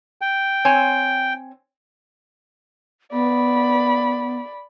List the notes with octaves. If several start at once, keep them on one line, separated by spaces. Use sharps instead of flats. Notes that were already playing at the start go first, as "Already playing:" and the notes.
G5
C4 C#5 G#5
B3 D5 B5